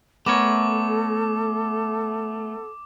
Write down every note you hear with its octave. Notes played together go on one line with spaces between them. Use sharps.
A3 B3 A4 A#4 C#5 D6